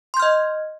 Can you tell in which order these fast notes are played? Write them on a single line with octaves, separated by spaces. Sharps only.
C6 G6 F6 D#5